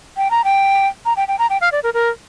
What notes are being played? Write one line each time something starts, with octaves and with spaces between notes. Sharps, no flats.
G5
A#5
G5
A#5
G5
G5
A#5
G5
F5
D5
A#4
A#4